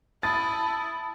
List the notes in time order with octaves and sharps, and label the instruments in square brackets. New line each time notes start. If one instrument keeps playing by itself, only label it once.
[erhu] E4 [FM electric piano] A5 D#6 [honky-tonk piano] A6